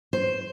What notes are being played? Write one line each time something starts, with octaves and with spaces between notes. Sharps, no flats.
C5